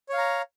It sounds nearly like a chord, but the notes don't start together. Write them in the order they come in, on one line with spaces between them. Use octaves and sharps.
C#5 F5 A#5